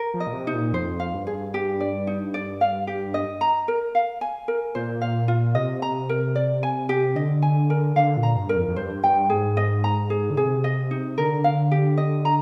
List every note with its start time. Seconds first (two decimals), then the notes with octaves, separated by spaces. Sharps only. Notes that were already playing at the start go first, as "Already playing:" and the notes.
Already playing: A#4
0.14 F3
0.20 D#5
0.27 A#2
0.33 C3
0.47 D#4
0.54 A#2
0.73 F2 C5
1.00 F5
1.14 G2
1.27 G#4
1.54 G4
1.81 D5
2.07 D#4
2.34 D5
2.61 F5
2.87 G4
3.14 D#5
3.41 A#5
3.68 A#4
3.95 F5
4.21 G#5
4.48 A#4
4.75 A#2 C5
5.01 F5
5.28 F4
5.55 C3 D#5
5.82 A#5
6.09 A#4
6.35 D5
6.63 G#5
6.89 G4
7.15 D3 D#5
7.42 G#5
7.70 A#4
7.96 D3 F5
8.17 A#2
8.23 A#5
8.36 G2
8.49 A#4
8.56 F2
8.68 F2
8.76 G2 C5
9.04 G2 G5
9.30 G#2 G#4
9.57 D#5
9.84 A#5
10.10 G#4
10.30 D3
10.37 C3 G#4
10.64 D#5
10.91 D#4
11.18 D3 A#4
11.44 F5
11.72 G4
11.97 D#5
12.25 A#5